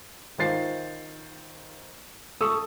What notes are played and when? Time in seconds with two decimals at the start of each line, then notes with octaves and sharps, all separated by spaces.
0.38 D#3 F4 C5 A6 C7
2.41 A4 C#6 D#6 E6